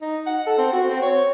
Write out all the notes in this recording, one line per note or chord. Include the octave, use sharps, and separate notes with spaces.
D#4
F#5
A4
C4
F#4
C4
C#5